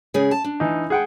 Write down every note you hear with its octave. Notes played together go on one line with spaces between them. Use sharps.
C#3 G#3 G#4
A5
D4
E3 D#4
G#4 F#5 G5